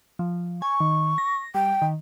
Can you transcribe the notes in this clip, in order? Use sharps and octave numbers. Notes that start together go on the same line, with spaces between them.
F3
G#5 C#6
D#3
A#6
G3 G5
D#3